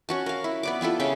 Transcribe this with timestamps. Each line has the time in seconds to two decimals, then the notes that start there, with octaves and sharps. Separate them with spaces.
0.09 C#4 F#4 A5
0.26 A#4 F5
0.44 E4
0.63 B3 D5 D6
0.81 G3 E4 F4 A4
1.00 C#3 E5 G5